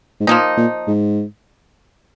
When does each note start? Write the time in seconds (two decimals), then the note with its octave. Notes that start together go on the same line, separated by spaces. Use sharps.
0.20 G#2
0.27 A#2 F3 A#3 D#4
0.57 A#2
0.87 G#2